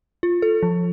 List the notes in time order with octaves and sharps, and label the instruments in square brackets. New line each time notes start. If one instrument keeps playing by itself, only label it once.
[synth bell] F4
A4
F3